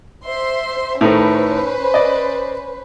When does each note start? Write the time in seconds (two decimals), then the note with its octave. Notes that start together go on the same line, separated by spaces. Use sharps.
0.24 C5 E5 C6
1.01 A2 D#3 A3 C#4 B4 C5
1.94 D5 D#5